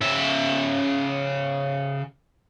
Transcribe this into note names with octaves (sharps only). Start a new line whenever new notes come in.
C#3 E5